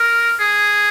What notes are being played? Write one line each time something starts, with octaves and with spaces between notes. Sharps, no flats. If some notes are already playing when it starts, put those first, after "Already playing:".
Already playing: A#4
G#4